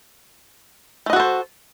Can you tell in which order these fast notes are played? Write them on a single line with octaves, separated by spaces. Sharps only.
A3 D#5 F#4 A4 C5